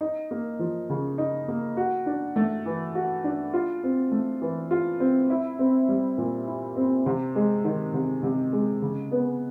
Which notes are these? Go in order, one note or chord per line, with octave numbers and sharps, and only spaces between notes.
D#4
A#3
F3
C#3
D#4
A#3
F#4
D4
A3
E3
F#4
D4
F4
C4
A3
E3
F4
C4
E4
C4
G3
A#2
E4
C4
C3
G#3
D#3
C3
C3
G#3
C#3
B3